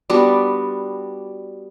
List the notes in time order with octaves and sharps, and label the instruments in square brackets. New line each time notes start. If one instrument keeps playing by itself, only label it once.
[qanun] G3 B3 D4 F#4